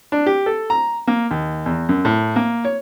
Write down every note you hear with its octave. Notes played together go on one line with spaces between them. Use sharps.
D4
G4
A4
A#5
A#3
D#2
E2
F#2
A2
A#3
C#5